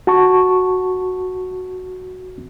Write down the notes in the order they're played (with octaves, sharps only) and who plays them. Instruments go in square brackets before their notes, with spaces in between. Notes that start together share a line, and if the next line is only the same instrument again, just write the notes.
[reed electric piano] F#4 A5 C#6